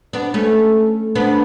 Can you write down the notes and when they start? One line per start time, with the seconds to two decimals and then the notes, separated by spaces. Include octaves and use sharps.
0.13 B3 D4
0.34 A3 C#4
1.15 B3 D4